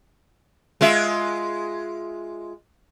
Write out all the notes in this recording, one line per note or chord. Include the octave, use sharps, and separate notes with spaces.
G#3 F4 E5